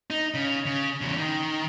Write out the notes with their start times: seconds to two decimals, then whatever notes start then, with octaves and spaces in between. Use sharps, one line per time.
0.10 D#4
0.34 C#3
0.66 C#3
1.01 E2 C#3
1.18 D#3